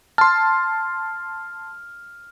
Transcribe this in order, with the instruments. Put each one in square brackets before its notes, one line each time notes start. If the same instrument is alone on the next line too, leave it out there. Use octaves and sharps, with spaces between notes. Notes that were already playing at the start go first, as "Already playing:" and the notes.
[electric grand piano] A5 C6 [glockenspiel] F6